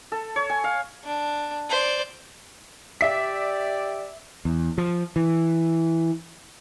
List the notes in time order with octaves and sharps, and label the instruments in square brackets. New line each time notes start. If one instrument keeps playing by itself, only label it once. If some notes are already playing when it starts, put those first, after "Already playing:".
[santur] A4
C#5
G#5
F5
[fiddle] D4
C5 D5
[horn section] G4 D5 [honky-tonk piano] E5 B6
[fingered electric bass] E2
F3
E3